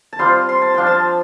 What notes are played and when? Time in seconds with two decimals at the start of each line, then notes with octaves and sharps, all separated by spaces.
0.13 A5
0.19 G3 C4 F4 C6
0.49 C6
0.62 A5
0.74 F3 D4 F4 G5
0.87 A5